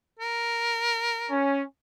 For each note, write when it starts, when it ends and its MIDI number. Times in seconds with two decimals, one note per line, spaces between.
0.19 1.41 70
1.30 1.62 61